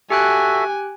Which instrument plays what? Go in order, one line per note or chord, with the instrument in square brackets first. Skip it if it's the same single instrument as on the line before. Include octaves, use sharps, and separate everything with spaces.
[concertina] F#4 A4 E5 [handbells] G4 G5 F#6 [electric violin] G#5